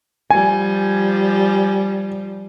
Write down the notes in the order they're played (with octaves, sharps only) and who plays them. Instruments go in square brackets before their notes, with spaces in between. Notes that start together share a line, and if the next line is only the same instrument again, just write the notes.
[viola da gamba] F3 G3 [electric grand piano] G#5